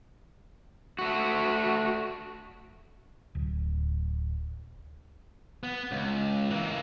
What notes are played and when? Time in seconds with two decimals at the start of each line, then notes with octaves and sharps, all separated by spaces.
0.99 A3 F#4
3.35 D1
5.63 B3
5.92 C#2
6.51 E3 A#3